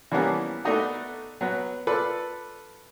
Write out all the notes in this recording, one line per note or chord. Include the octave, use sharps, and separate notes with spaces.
E3 F3 G3 A#3 B3 C#4
A3 B3 D4 D#4 F#4
F#3 B3 B4
F4 A4 B4 D5